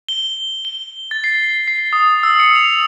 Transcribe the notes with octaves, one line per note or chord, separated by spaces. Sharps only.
G7
G7
A6
C7
C7
D#6
E6
C#7
F7